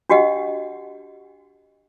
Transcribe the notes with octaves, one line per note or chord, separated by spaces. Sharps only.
D4 F#4 G4 D#5 F#5